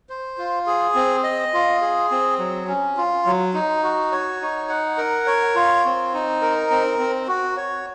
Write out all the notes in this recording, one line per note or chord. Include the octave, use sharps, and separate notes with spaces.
C5
F4
G#4
C4
D#5
F4
G#4
C4
F#3
C#4
F4
F#3
D#4
F#4
C#5
D#4
F#5
A#4
C#5
F4
C4
D#4
A#4
C4
C4
F#4
C#5